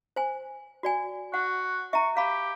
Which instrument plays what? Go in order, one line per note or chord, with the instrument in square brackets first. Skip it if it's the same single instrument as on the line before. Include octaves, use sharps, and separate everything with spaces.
[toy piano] C5 G#5
F#4 D5 G#5
[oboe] F#4 [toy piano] F#5
[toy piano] E5 A#5 [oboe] C#6
[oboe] G4 [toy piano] F5 B5